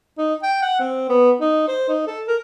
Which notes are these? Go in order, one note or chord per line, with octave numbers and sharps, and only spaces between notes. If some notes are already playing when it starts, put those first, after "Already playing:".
D#4
G5
F#5
C4
B3
D#4
C5
D#4
A4
A#4